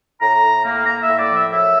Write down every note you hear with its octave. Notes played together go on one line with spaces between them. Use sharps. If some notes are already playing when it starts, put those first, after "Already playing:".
A2 A#5
A2
A#3
A#3 A#5
E5
A2
D5
F3
E5
F#2 E5